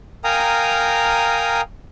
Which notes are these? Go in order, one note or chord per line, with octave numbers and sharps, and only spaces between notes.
A#4 F5 G5 G#5 A#5 D#6